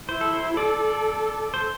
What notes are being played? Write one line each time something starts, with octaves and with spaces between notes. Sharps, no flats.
E4 C5
A4
C5
A4 D5
C5